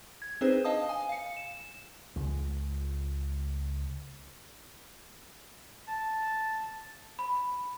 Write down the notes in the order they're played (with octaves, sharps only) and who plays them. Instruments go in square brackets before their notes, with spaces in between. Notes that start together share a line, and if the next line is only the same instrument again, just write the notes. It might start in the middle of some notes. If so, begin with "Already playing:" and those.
[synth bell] G#6
C4 D4 D#4 G#4 B4 C5
D#5 F5 A5 D#6
G#5
F5 C#7
E7
[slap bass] C#2 G#3
[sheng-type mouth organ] A5
[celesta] B5